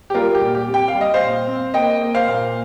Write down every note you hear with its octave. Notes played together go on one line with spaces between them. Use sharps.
G4
G3 F4 A#4
G4
A#2
G4
C4
G5
F5
G3
D#5
C5 F5
A#2
C4
A#3 D#5 G5
A#3
C5 F5
A#2